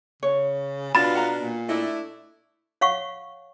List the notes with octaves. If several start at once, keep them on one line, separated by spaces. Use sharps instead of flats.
C#3 C#5
B2 B3 D4 F4 B5 A6
F#5 A#5
A#2
A3 D4 E4 D#5
C#5 F5 F#5 C#6